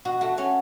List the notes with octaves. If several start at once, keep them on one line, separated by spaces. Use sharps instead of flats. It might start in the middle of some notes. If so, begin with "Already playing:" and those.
B2 F#4
A3 F#4
A3 C#4